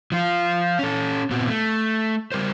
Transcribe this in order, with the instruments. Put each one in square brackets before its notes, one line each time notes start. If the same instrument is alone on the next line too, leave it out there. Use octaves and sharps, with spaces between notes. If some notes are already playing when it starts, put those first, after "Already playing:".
[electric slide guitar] F3 F4
C#4 A4
A#2 B3 C4 F#4
A3
G3 A#4 C5